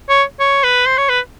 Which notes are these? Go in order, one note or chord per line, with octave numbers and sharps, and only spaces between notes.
C#5
C#5
B4
C5
C#5
B4